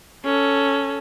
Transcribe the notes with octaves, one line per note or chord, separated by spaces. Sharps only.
C#4 A4